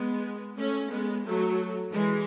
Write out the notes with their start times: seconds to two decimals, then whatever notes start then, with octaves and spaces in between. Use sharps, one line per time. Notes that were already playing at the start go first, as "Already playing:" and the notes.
Already playing: G#3 B3
0.58 A3 C#4
0.91 G#3 B3
1.25 F#3 A3
1.92 E3 G#3